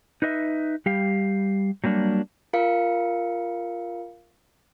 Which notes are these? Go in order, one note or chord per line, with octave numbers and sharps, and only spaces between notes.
D#4 B4 D#5 E5
G3 G4 F5
F#3 G3 A#3 D4
F4 A#4 F5 C#7